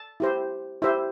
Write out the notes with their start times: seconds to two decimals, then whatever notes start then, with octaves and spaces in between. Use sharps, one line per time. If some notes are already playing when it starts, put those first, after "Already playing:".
Already playing: A5
0.20 E4 G4 C5
0.82 E4 G4 C5 E5